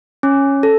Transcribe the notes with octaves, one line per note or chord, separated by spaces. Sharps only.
C#4
A4